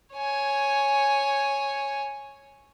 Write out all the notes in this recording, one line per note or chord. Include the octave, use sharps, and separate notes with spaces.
C#5 G#5